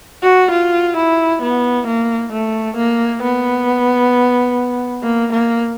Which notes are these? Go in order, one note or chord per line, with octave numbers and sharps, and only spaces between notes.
F#4
F4
E4
B3
A#3
A3
A#3
B3
A#3
A#3